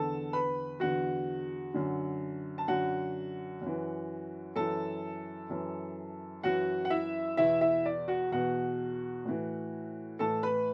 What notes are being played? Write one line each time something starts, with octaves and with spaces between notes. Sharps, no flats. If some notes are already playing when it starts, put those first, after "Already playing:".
Already playing: E2 D3 A4 A5
B4 B5
E2 D3 F#4 F#5
F#2 D3
A5
F#2 D3 F#4 F#5
F#2 E3
F#2 E3 A4 A5
F#2 E3
F#2 E3 F#4 F#5
F#5
E4 E5
E2 B2 E4 E5
E4 E5
D5
F#4 F#5
E2 B2 F#4 F#5
A2 E3
A2 E3 A4 A5
B4 B5